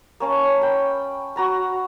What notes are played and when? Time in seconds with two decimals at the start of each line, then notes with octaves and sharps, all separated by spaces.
0.20 A#3 C#4 A5
0.62 G5 B5
1.36 F#4 A#5 B5